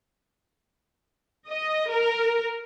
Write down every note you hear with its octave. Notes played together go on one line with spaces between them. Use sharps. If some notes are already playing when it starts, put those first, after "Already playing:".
D#5
A#4